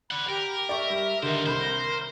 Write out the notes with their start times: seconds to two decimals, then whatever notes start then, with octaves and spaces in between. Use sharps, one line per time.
0.11 D5 F#5 B5
0.28 G4 A#4
0.69 D5 E5 G5 C#6
0.90 G3
1.23 D3 D#3 B3 A#4 C5
1.46 C2 C5 B5 C6